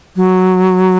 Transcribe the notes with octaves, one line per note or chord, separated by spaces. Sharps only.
F#3